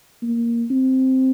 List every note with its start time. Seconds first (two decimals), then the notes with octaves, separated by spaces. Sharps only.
0.22 A#3
0.70 C4